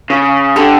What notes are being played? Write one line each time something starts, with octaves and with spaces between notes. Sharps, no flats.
C#3
D3 G4 A4